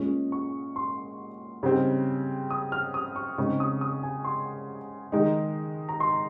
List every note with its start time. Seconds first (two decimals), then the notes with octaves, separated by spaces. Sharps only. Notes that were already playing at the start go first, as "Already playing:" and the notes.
Already playing: A#2 G#3 C#4
0.32 C#6
0.76 C6
1.63 C#3 G3 C4 D#4
2.51 D#6
2.72 F6
2.94 D#6
3.16 C#6
3.38 C#3 G#3 C4 D#4 C#6
3.60 D#6
3.81 D#6
4.03 G#5
4.25 C6
5.12 D#3 G#3 D#4
5.89 A#5
6.00 C6